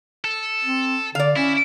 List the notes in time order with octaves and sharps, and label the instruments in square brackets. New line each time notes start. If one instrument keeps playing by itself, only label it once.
[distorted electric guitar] A4
[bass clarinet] C4
[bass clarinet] D3 [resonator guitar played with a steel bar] D5 F5
[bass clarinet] C#4 [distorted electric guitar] E4